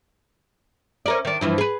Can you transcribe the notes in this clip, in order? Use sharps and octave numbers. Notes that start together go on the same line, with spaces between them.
C#4 A#4 D5
D#3 D4
G2 E3 F3
G#4 B4